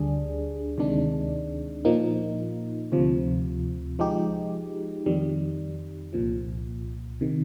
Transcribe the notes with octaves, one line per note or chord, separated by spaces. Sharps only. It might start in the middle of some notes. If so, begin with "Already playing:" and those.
Already playing: D2 D3 G3 D4 G#4
D2 C3 D#3 G#3 D4
A#2 F3 A#3 D#4
D2 C3 F3
F3 G#3 D#4 G4
F2 D#3 G3
C2 A#2 F3
C3 D#3